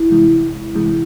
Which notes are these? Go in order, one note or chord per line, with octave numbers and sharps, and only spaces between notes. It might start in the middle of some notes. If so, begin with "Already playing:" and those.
Already playing: E4
C3 E3 G#3
C3 E3 G#3